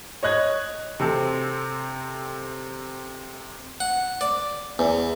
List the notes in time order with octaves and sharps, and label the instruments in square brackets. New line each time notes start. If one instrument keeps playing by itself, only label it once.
[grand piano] C#5 D#5 F#6 G#6
[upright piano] C3 C4 A4
[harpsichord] F#5
D5
E2